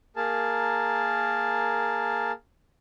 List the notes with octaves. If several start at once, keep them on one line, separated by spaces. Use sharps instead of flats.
A#3 G#4 A#4 A5